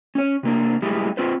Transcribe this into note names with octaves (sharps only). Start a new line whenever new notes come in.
C#4 C#5
C3 A#3 D4
A2 G3 G#3 E4 G4
C4 F4 B4 C5